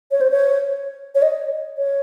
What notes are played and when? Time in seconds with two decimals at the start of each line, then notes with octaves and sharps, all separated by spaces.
0.11 C#5
0.21 C5
0.31 C#5
1.15 C#5
1.22 D#5
1.77 C#5